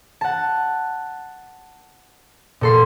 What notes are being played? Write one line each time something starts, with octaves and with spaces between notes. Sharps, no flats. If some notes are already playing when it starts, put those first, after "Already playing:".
F#5 A5
A#2 A4 C6